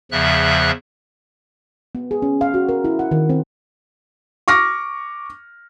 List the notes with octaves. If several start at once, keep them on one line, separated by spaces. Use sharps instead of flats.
E2 C#3 F3 E5 F#6
B3
G#4
C#4
F5
F#4
A#4
E4
F#5
D#3
C4
C#6 D6 F6 A#6